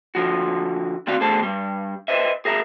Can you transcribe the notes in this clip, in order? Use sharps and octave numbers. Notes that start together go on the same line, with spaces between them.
D3 F3 F#4
D2 D#3 C4 F#4 D5 F5
E2 D3 A3 G#4 C5 A5
G2 G3
B4 C5 D#5 E5
G#4 A#4 E5 A#5